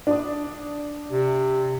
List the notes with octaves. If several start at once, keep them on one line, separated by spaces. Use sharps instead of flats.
D4 D#6
C3